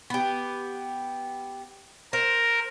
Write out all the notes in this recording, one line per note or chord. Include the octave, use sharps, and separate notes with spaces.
B3 G4
A#4 C5